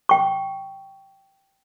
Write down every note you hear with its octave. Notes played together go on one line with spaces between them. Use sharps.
G5 C#6